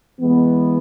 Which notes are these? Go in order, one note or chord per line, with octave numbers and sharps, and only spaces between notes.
E3 G#3 B3